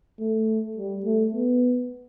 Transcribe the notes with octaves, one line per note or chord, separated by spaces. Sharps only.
A3
G3
A3
B3